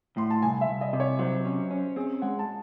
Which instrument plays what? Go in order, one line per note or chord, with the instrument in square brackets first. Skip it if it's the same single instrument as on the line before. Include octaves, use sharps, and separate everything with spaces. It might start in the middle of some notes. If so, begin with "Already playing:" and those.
[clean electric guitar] A2 [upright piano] C6
[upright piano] A5
[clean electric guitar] C2 [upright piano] G#5
[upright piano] E5
[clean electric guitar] C2
[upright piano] D#5
[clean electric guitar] C3 [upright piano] D#5
[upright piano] C#5
[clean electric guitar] F#3 [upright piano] C5
[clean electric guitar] C#4
C#4
[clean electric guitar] C4 [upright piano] G#4
[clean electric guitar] G#3 [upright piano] F#5
[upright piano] A5